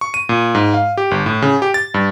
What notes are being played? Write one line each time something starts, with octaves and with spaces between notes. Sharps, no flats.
C#6
D#7
A#2
G#2
F5
G4
G1
A2
C#3
G4
A6
G2